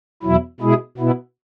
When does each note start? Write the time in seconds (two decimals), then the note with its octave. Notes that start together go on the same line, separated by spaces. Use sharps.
0.23 E2 B2 F#3 E4
0.60 B2 G#3 E4 G#4
0.98 B2 B3 E4